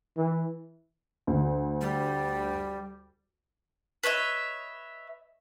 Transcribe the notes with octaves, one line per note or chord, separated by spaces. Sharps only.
E3
D2
G3
B4 C#5 D#5 E5